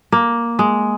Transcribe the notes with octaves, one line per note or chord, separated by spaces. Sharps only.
A#3
G#3